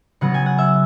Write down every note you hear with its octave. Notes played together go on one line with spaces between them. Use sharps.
C#3 F#3 B3 F#5
G#5
F#5
E5